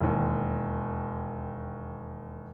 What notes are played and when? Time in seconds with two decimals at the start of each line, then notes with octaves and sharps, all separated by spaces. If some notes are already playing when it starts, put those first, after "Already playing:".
0.01 E1 D#2